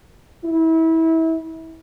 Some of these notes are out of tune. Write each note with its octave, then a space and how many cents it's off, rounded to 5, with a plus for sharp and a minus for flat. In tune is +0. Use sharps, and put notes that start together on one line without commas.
E4 -25